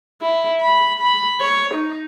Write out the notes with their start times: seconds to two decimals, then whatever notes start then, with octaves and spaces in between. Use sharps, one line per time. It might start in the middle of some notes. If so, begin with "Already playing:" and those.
0.22 E4
0.61 B5
0.99 B5
1.40 C#5
1.74 D#4